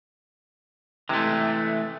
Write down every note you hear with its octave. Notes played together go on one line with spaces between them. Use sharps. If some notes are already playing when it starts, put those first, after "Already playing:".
C3 E3 G#3 A3